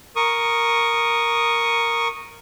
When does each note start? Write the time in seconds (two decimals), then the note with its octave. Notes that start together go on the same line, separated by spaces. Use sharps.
0.16 A#4 C#6 D#6